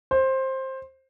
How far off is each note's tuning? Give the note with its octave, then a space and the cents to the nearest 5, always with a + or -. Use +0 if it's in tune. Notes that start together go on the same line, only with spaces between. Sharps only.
C5 +15